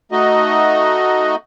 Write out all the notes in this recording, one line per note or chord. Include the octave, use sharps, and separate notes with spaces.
A3 D#4 F#4 D#5